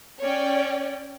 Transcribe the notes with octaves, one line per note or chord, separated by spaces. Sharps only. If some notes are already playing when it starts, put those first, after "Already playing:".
C#4 C#5 D5 G5